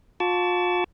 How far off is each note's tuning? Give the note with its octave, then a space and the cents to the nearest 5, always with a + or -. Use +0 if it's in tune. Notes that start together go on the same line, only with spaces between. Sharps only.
F4 +35 A5 +0 C#6 +45